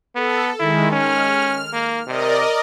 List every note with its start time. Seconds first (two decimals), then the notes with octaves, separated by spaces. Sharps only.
0.16 B3 A4
0.59 D#3 G#3 E4
0.92 C#4 F6
1.73 A#3
2.07 C3 A#4 D5 D#5